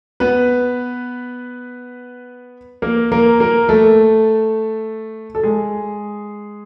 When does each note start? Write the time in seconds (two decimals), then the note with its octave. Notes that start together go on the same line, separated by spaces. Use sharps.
0.20 B3 B4
2.82 A#3 A#4
3.12 A#3 A#4
3.40 A#3 A#4
3.69 A3 A4
5.35 A4
5.43 G#3 G#4